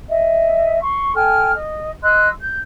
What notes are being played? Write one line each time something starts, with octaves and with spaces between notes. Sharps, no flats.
D#5 E5
C6 C#6
A4 G5 G#5 F6
D#5
D#5 C6 E6 F#6
G6